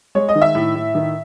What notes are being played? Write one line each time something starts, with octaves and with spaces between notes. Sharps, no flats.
G#3 C#5
D#5
D#3
E5
A2
A2
D#3